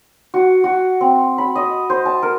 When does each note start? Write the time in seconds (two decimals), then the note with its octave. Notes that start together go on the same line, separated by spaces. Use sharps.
0.34 F#4
0.64 F#4
1.01 C4
1.38 B5
1.55 D#5
1.90 C5
2.05 A5
2.23 A#4